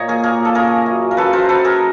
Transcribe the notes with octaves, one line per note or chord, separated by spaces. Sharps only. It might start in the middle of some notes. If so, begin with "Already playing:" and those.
Already playing: A#2 C#5 D#5
G#4 A#4
A#3 G#4 A#4
A4
C#3 G#4 A#4
F#2
A#4
F#2 A4 B4
A#4 C5
F#3 A4 B4
G#4 A#4